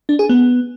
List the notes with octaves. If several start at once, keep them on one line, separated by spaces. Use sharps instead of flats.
D4
G#4
B3